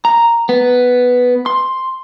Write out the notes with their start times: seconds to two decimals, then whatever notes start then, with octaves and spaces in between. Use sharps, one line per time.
0.05 A#5
0.49 B3
1.46 C6